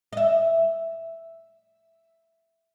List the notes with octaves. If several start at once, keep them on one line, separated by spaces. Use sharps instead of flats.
D#5 E5